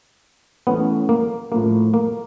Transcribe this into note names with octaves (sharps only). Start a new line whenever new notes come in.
E3 A3 B3 C#4
A#3
A2 F3 A3 A#3
A#3